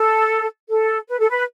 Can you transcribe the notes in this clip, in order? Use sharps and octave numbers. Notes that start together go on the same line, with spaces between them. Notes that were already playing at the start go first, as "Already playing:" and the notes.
Already playing: A4
A4
B4
A4
B4